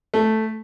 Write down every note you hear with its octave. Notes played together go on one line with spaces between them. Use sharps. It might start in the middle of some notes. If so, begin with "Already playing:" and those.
A3